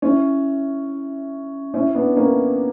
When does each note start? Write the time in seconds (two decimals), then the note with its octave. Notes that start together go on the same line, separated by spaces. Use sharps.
0.02 C#4 E4
1.74 C#4 E4
1.95 B3 D4
2.16 A#3 C#4